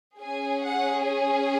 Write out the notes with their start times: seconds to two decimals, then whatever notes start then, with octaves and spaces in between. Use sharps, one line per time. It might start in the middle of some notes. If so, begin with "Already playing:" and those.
0.20 C#4 G#4 G#5
0.64 F#5
1.08 G#5